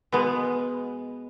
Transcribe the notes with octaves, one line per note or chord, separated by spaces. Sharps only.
B2 G#3 B3